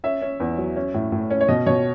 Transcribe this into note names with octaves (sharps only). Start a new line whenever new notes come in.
C#4 E5
C#4
E2
F#3
C#4
A2
A2
C#4
C#5
B2 D#5
B2 C#5